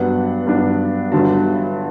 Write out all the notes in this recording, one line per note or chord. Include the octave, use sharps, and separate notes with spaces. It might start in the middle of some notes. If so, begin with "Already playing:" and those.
Already playing: G2 F#3 B3 D4 F#5
G2 F#3 B3 D4
G1 G2 D3 F#3 A5